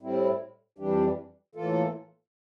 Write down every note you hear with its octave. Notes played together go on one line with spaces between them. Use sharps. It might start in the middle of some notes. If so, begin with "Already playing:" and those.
A2 G3 C4 E4
F2 E3 G3 D4 G4
A2 E3 A#3 F4 A4